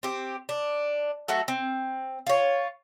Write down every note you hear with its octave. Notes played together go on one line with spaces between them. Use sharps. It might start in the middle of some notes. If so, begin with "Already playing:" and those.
C4 G4
D4
F#3 A3 F#4 A4
C4
F4 C#5